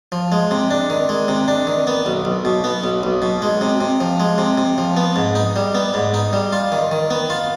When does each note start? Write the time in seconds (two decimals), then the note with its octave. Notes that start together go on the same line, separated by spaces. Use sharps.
0.12 F3
0.32 G#3
0.51 C3
0.71 D4
0.90 D#3
1.09 G#3
1.28 C3
1.48 D4
1.67 D#3
1.87 B3
2.06 B1
2.25 B1
2.45 B2
2.64 B3
2.84 B1
3.03 B1
3.22 B2
3.42 G#3
3.61 C3
3.81 C3
4.00 F3
4.20 G#3
4.38 C3
4.58 C3
4.78 F3
4.97 B3
5.16 G#2
5.35 D#4
5.56 G3
5.75 B3
5.94 G#2
6.14 D#4
6.33 G3
6.52 F4
6.72 D#3
6.91 D#3
7.10 B3
7.30 F4